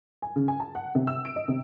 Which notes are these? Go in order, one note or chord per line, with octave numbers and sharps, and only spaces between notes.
G#5
C#3
G#5
A5
F#5
C3
E6
D7
D#5
C3